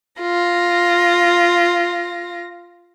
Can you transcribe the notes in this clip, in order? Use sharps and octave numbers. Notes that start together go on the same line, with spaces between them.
F4 A#6